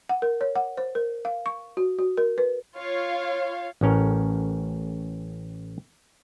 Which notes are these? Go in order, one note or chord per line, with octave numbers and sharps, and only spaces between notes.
F#5
A#4
C#5
F#5
C5
A#4
F5
C#6
F#4
F#4
A#4
B4
F4 C#5 F5
A1 A2 C#4 A#4